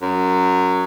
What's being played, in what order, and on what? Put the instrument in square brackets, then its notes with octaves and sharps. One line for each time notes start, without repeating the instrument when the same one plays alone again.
[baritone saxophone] F#2